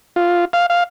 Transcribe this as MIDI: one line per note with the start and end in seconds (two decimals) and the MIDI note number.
0.16 0.45 65
0.53 0.66 77
0.70 0.84 77